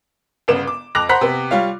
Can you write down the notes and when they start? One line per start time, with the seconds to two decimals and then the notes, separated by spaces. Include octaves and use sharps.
0.48 G1 C#3 B3 E7
0.67 D6
0.95 F2 D6 F#6 A#6 F7
1.09 C5 F#5 A#5 B5 F#6 B6
1.21 C3 B3
1.51 G3 F4 C#5 F5